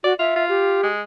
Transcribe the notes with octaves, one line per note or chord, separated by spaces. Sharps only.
F#4 D5
F4 E5
F4
G4
G#3